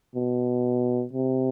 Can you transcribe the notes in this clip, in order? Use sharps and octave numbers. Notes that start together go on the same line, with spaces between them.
B2
C3